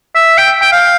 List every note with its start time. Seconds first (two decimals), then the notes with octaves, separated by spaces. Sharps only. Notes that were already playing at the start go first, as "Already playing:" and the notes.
0.15 E5
0.38 G5
0.62 G5
0.72 F5